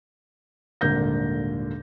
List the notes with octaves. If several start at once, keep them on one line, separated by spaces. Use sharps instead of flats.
D#1 G#1 D3 A#3 G6 A#6